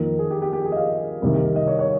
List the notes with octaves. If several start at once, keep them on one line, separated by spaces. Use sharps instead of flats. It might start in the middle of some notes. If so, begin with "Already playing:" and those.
Already playing: F2 D#3 A#3 A#4
G#4
G4
G4
G4
G#4
D#5
F5
C2 C3 D#3
D#5
C#5
C#5